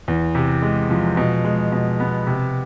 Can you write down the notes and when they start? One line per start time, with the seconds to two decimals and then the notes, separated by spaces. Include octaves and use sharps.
0.08 E2
0.35 C3
0.62 G#3
0.90 F3
1.17 B2
1.44 G#3
1.72 B2
2.00 B3
2.27 C3